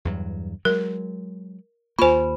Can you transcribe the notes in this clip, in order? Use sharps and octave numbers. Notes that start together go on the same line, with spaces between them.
E2 G2 F#3
F#3 G#3 A#4
D#2 A#3 F4 C5 G#5 B5